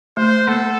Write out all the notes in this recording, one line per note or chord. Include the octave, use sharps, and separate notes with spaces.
A3 C5
A#3 A4